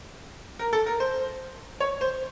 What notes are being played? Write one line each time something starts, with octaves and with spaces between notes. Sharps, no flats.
A#4
A4
A#4
C5
C#5
C5